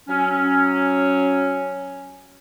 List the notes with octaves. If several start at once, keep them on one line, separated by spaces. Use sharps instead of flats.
F#3 C#4